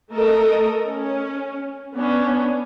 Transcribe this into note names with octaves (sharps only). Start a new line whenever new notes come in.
A3 A4 A#4 D#5
C#4
B3 C#4 D4